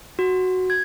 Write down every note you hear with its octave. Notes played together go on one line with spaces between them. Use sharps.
F#4
G#6